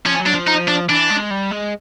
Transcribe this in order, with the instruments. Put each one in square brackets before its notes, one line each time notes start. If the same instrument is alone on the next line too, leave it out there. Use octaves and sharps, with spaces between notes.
[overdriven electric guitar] F3 [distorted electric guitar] C#4
[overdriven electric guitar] F#3
[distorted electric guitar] D4
[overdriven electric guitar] F3
[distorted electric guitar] D#4
D4
[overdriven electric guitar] E3 [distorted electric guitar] D4
[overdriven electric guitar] G#3
G3
G#3